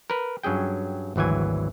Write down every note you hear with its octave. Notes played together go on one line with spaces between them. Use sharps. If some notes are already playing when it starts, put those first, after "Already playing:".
A#4 B4
G2 F#3 C#4 G#4 G5
G#1 D2 E3 F#3 G#5